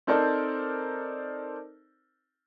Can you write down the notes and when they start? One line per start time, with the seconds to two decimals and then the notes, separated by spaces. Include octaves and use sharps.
0.07 C4 D#4 A4 A#4 C5 D5